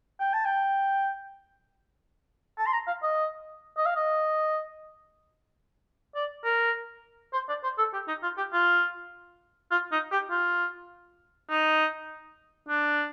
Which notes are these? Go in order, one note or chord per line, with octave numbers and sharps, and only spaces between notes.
G5
A5
G5
A5
C6
A#5
F5
D#5
D#5
F5
D#5
D5
A#4
C5
D5
C5
A4
G4
D#4
F4
G4
F4
F4
D#4
G4
F4
D#4
D4